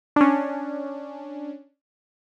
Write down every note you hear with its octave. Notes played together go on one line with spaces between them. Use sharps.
C#4 D4